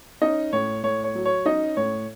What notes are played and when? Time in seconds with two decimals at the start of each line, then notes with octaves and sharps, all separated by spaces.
0.21 C#4 D#4 D#5
0.53 A2 C#5
0.84 A2 C#5
1.04 C#5
1.15 F#3
1.25 C#5
1.46 C#4 D#4 D#5
1.77 A2 C#5